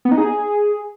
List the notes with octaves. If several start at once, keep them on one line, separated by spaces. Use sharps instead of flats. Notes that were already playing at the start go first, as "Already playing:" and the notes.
B3
D#4
G#4